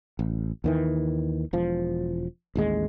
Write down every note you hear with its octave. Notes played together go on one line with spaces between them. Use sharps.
A1
D#2 D#3 E3
E1 F3
A1 D#2 G#3